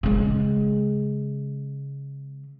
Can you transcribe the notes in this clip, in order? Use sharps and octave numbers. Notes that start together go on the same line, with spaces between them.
C#3 G#3